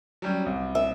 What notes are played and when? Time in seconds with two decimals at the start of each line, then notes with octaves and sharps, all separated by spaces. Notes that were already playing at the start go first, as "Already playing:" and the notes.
0.22 F#3 G3 C#4
0.46 C2
0.75 E5